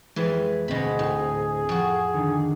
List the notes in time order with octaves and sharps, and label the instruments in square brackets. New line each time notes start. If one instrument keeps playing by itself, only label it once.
[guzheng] F2 E3 [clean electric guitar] G#3 G#4 B4
[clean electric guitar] D2 C4 D#5 [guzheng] B2 B5 [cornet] G#4
[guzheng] A2
F2 F#4
[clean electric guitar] D3 D#3